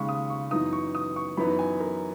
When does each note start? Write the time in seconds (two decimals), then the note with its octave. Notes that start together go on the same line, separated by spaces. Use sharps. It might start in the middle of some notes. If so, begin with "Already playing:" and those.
Already playing: D#2 C#3 G#3 C#6
0.09 D#6
0.30 C#6
0.51 F#2 E3 B3 D#4 D#6
0.73 C#6
0.95 D#6
1.16 C#6
1.37 F#2 E3 B3 D#4 B5
1.59 G#5
1.80 A#4